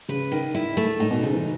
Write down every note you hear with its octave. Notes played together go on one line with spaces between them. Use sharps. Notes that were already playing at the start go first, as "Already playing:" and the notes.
C#3 B4
D#3
E4
A3
A2 D#4
B2
G#2 C#3
E3